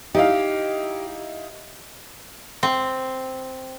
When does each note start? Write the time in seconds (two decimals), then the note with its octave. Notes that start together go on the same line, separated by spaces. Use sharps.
0.15 D#4 E4 G4 F5
2.63 C4